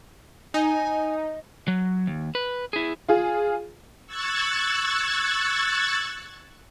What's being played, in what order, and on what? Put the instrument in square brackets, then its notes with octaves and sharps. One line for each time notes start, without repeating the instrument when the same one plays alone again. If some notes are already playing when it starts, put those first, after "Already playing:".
[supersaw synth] D#4 [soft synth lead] D#5 [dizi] G#5
[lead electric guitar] F#3
D#2
B4
E4 G#4
[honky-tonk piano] F4 G#4
[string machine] C#6 E6 F#6 G#6 A6